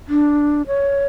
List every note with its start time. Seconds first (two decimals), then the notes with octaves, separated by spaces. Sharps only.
0.09 D4
0.67 C#5